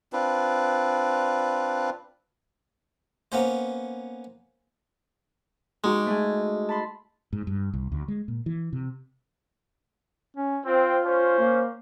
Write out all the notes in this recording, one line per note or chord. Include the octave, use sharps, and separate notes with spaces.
C4 D4 F4 B4
A#3 B3 C#4 C5
G#3 D#4 F#4 G4
A3 G#4
A5 B5 C6
G#2
G2
C2
D2
G#3
A#2
E3
C3
C#4
C4 F4
C#4 C5
A#3